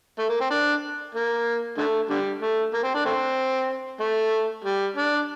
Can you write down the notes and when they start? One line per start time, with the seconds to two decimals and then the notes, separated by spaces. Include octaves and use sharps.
0.19 A3
0.29 A#3
0.41 C4
0.51 D4
1.15 A#3
1.78 D3 A3
2.10 D3 G3
2.42 A3
2.74 A#3
2.84 C4
2.94 D4
3.05 A3 C4
4.00 A3
4.65 G3
4.96 D4